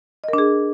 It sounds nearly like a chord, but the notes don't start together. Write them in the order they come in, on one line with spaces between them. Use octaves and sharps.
D#5 A#4 D4 G#4